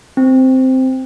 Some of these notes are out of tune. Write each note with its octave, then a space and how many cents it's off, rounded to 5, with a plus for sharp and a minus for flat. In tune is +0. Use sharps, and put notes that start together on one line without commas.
C4 -5